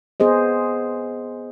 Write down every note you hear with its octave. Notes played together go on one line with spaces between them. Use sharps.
B3 G#4 C5 D#5